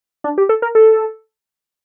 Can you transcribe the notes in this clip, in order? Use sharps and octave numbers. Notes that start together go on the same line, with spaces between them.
D4
G4
A4
A#4
A4